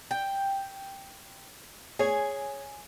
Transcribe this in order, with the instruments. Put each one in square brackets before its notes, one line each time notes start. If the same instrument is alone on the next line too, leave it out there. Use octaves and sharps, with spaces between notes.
[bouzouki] G5
[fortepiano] G#4 C#5 [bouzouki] G#5